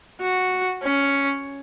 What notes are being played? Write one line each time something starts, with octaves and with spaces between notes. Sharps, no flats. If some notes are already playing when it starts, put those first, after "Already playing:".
F#4
C#4